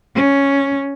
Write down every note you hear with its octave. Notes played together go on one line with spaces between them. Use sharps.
C#4